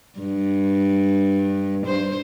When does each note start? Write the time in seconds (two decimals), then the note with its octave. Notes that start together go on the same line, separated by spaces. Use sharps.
0.19 G2
1.86 C5